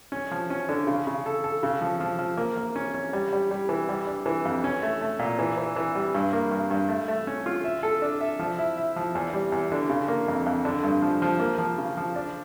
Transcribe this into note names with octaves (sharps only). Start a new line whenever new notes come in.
C#4
F3
C#4
D3
C#3
C#3
A4
A4
C#3
F3
F3
F3
A#3
A#3
C#4
C#4
G3
G3
G3
E3
G3
D4
E3
F2
C#4
A3
A3
A#2
E3
E3
E3
G3
G2
A#3
G2
G2
A3
A3
C#4
F4
E5
A4
D4
E5
F3
E4
E4
F3
E2
G3
E2
D3
C#3
A#3
F2
F2
D3
G2
F3
F3
A#3
F3
C#3
F3
D4